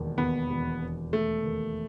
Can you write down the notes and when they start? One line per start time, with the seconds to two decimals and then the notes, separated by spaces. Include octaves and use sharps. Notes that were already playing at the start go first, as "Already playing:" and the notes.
Already playing: E1 D#2
0.18 D#2 B3
0.50 E1
0.81 E1
1.13 E1 A3
1.44 D#2